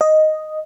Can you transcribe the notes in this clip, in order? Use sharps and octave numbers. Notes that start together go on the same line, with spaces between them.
D#5